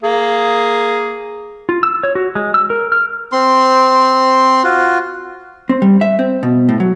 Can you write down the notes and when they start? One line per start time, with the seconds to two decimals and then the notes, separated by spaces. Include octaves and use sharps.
0.03 A#3 G#4
1.69 F4
1.83 E6
2.03 C#5
2.15 F#4
2.35 G#3
2.54 E6
2.70 A#4
2.92 F6
3.32 C4 C6
4.64 F4 F#4
5.69 C4
5.82 G3
6.01 E5
6.19 C4
6.43 B2
6.69 A2
6.80 F#3